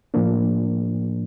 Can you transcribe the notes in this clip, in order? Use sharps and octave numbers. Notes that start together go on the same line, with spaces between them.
A2 F3 A#3 D4